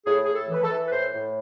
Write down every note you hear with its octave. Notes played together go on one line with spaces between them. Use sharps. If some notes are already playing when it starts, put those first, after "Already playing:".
A2 G#4
A2 G#4
A4
E3 B4
A4
E3
B4
A2 C5
A2